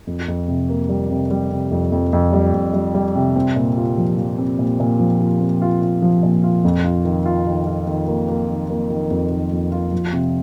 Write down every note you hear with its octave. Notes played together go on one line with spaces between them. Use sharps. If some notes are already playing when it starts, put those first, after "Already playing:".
F2
F2
C3
A#3
G3
C3
G3
C3
F2
F2
F2
G3
F2
G3
G3
C3
C4
A#2
F4
F3
F3
C4
A#2
A#2
F3
F4
C4
F4
F4
F3
A#2
F4
F2
F4
D#3
F4
D#3
F4
D#3
A#3
A#3
D#3
A#3
D#3
F2
D#3
F2
F4
F3
C3